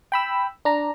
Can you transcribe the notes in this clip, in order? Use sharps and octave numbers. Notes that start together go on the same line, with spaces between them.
G5 B5 E6
D4 A#5